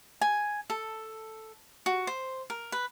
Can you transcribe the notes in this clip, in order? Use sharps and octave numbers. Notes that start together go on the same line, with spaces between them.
G#5
A4
F#4
C5
A#4
B4